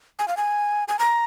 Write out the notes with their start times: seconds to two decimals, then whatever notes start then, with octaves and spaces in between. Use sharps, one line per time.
0.19 G#5
0.28 F5
0.37 G#5
0.88 G#5
0.99 A#5